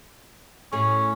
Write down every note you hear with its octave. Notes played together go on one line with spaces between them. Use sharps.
A2 C#4 G#4